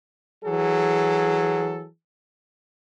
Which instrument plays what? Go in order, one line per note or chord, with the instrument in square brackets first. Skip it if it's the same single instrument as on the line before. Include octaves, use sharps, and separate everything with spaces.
[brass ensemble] E3 F#3 G#4 A4